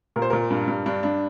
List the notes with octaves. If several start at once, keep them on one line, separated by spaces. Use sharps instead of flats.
A#2 A#4
C5
A#2 A#4
G2
G2
G2 D4
G2 D4